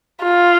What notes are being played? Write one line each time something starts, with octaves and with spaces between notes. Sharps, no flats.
F4